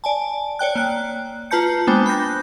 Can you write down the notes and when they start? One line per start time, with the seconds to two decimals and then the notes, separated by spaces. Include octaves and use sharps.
0.04 D5 G#5 A5
0.59 C#5 D5 G5 F#6
0.76 A#3 F#6
1.51 F4 B4 A5 A#5 G6 C#7
1.87 G#3 A#3 B3 D4 C5 G5
2.06 B5 F#6 G6 A#6